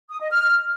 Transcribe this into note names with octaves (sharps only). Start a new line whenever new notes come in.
D#6
D#5
F6